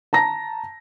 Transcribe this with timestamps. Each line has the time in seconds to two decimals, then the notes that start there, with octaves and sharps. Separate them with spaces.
0.13 A5 A#5 A#6